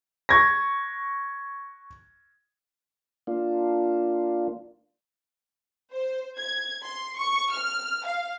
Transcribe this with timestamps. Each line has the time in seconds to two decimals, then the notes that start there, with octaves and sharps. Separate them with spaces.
0.29 C#6 G#6 A#6
3.27 A#3 D4 F4
5.94 C5
6.38 G#6
6.84 C6
7.18 C#6
7.52 F6
8.06 F5